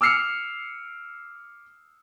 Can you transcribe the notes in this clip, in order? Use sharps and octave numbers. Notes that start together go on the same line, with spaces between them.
D6 E6 F6 C7 C#7 F7